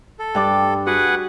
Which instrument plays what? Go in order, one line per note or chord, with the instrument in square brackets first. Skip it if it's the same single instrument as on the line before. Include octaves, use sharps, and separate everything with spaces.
[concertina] A4
[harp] G2 D5 D6
[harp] F#4 [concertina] G#4 B4 F#5